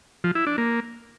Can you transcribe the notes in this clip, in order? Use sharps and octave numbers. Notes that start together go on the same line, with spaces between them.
F3
E4
D4
A#3